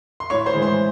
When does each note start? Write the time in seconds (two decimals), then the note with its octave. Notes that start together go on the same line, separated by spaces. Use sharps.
0.20 C6
0.30 A2 C#5 C#6
0.46 C5 C6
0.54 E3 G#3
0.62 C5 C6